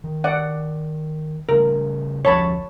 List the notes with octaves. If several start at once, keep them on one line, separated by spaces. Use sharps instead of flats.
D#3
D5 F#5
C#3 G3 A3 A#4
F1 D2 F3 C#5 A5 B5